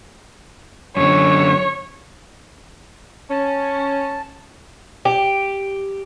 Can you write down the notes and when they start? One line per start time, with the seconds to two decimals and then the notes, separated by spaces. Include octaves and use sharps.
0.97 F#2 D3 C#5
3.31 C#4 A5
5.05 G4